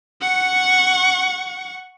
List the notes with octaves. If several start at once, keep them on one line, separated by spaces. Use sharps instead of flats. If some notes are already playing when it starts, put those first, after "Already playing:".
F#5 C#6